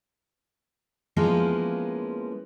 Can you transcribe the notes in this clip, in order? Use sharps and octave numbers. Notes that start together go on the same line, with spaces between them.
F3 G#3 A#3 B3 C#4 E4